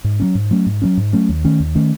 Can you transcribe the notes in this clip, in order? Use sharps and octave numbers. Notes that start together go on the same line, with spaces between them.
G#2
F#3 A3 C#4
G#2
F#3 A3 C#4
G#2
F#3 A3 C#4
G#2
F#3 A3 C#4
D#2
D#3 A3 C#4
D#2
D#3 A3 C#4